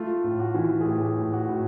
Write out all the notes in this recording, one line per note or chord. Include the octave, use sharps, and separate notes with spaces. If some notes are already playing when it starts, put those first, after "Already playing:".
Already playing: A3 F4
A2
F#4
E3
G#4
A2 G4
A2
F#4
A2